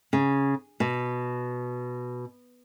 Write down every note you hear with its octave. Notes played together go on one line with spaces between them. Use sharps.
C#3
B2